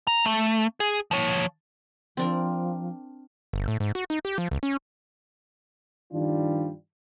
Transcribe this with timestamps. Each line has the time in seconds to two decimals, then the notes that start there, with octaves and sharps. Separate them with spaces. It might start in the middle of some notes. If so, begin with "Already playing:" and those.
0.07 A#5
0.25 A3
0.80 G#4
1.11 F3 C#5
2.17 F3 C4 D4 A#4
3.53 G1
3.68 A2
3.80 G#2
3.95 F#4
4.10 D#4
4.25 G4
4.38 F3
4.51 C#2
4.63 C#4
6.13 G2 D#3 F3 G3 D4 F4